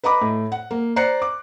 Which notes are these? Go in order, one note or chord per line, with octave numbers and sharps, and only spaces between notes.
B4 D#5 A#5 B5 D6
A2
F#5
A#3
C5 D5 A#5 F#6 C7 C#7
D6